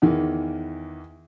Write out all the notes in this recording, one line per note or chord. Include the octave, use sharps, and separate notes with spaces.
E2 D#3 E3